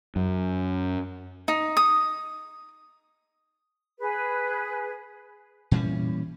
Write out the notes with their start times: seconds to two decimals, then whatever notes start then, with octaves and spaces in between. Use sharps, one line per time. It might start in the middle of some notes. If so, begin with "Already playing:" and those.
0.16 F#2
1.48 D#4
1.77 D#6
4.00 G#4 B4
5.71 A#2 E3 G3 C#4